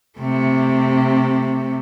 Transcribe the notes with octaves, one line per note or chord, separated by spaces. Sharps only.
C3 A3